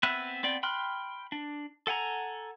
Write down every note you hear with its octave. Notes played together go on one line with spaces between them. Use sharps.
B3 C4 B4 E5 F#6
B3 C4 D5 G5
G5 B5 C6 F6 F#6
D4
A4 F#5 G#5 A#5